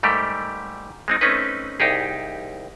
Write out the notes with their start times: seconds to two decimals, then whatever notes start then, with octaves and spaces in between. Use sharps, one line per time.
0.03 G#2 G3 A3 G4 A#4
1.08 G#3 C4 D#4
1.21 A3 C4 C#4 D#4 B4
1.80 C2 D#4 G4 G#4